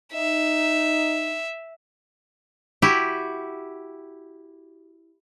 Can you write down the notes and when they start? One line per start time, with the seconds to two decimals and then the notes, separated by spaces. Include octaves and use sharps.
0.14 D#4 E5
2.82 E4 F#4 G4